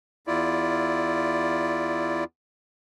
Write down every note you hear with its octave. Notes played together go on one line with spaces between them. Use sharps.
E2 E4 F4 D5